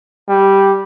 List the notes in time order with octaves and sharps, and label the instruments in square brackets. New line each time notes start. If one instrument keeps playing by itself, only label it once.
[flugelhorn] G3